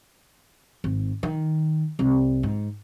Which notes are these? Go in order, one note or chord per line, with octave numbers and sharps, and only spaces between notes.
G#1
D#3
C2
G#2